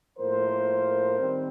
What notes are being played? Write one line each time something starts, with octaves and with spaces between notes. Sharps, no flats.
A2 F3 A#3 A#4 C5
D#3 G3 C4